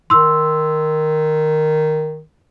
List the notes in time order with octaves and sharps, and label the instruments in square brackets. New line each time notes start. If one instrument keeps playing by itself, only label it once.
[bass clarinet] D#3 [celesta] C6 E6